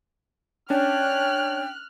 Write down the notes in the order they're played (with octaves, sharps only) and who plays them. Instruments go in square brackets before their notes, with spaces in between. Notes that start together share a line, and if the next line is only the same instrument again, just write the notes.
[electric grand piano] C#4 D4 [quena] C#5 [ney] G5 [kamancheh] F6 F#6